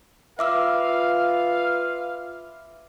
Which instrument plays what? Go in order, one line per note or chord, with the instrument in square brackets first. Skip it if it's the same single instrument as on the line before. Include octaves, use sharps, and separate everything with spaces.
[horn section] F4 B4 F5 [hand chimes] E5 D6 E6